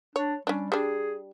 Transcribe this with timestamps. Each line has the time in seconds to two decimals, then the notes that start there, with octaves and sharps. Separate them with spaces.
0.16 D4 C#5
0.47 G3 C#4 D4
0.72 G3 D4 G#4